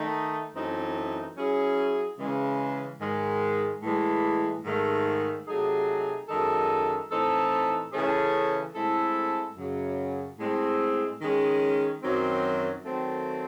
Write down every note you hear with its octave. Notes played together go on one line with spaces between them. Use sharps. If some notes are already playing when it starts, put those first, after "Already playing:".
Already playing: D#3 A3 D#4
F#2 E3 A3 C4 D#4
F#3 C#4 E4 G#4
C#3 E3 G#3
G#2 D#3 G#3
A2 E3 G#3
G#2 D#3 A3
C3 F#3 A3 D#4 G#4
F#2 D#3 G#3 D#4 A4
A2 E3 C4 D#4 A4
C#3 E3 A3 C#4 G#4
A2 G#3 C4 E4 A4
F#2 C#3 F#3
A2 G#3 C4
D#3 G#3 C#4
F#2 D#3 F#3 C4
D#3 F#3 A3 C4